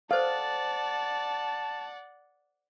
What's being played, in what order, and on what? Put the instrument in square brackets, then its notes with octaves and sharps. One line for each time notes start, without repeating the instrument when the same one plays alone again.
[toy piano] A4 C5 [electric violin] D5 F#5 [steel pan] F5 [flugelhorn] A5